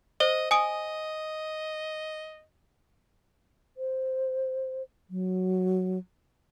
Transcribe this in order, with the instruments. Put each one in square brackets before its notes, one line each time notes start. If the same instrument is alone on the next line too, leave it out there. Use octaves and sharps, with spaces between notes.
[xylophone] C5 G7 [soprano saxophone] D#5
[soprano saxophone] D#5 [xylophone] G#5 D#6 D7
[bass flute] C5
F#3